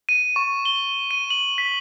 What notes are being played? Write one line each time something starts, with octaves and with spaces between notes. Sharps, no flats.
D#7
C#6
G7
D#7
F#7
B6